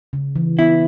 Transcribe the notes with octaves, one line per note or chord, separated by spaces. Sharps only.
C#3
E3
B3 E4